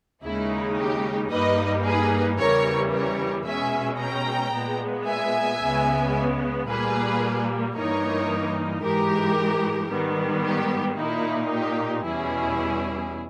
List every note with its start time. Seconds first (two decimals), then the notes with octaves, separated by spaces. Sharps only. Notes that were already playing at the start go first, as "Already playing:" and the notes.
0.24 D#2 C#3 G#3 D#4 E4
0.77 G4
1.31 G2 G3 A#3 D#4 B4 D#5
1.85 G#4 B4
2.39 E2 C#3 E3 G3 A#4 C#5
2.92 A#4 C#5
3.46 B2 G#3 C#4 E5 G#5
3.99 G5 A#5
4.53 A#2 G#3 B3
5.07 E5 G#5
5.61 C#2 C#3 G#3 B3
6.68 A#2 G3 A#3 G#4 B4
7.75 G2 E3 A#3 D#4 A#4 C#5
8.83 G#2 E3 G#3 G4 A#4
9.90 G#2 D#3 G3 B3
10.44 G4
10.98 A#2 A#3 D#4 E4
11.51 G4
12.05 E2 B2 G3 C#4 E4 G#4